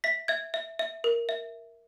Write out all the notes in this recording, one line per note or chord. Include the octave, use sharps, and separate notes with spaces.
E5 B6
E5 G#6
E5
E5
A#4
E5